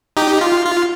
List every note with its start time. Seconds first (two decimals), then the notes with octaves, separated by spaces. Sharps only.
0.17 D#4 G4
0.41 F4
0.66 F4